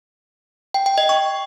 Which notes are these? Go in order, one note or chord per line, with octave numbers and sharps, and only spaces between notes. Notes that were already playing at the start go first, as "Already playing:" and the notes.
G5
G5
D#5
C#6